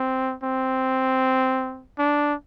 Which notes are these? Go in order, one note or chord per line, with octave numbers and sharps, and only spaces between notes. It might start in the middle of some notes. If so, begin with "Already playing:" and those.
Already playing: C4
C4
D4